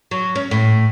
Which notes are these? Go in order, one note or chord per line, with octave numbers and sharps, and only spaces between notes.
F#3
C#4
A2